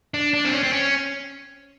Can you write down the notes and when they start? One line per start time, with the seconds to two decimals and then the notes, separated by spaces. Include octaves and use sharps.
0.14 D4
0.34 D4
0.45 C4
0.54 C#4
0.63 C4
0.73 C#4